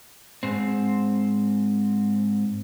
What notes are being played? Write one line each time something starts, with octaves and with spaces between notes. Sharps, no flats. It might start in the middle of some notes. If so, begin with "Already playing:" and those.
G#2 C4